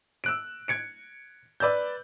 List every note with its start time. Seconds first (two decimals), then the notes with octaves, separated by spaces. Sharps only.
0.24 E6 F#6 D7
0.68 G#6 C#7 D7
1.60 B4 D5 E6 G6